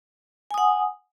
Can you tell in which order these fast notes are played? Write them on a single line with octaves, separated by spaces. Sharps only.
G#5 D#6 F#5